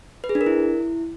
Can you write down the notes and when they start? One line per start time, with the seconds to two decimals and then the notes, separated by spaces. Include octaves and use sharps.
0.24 B4
0.29 G#4
0.35 D4
0.41 A#4
0.46 E4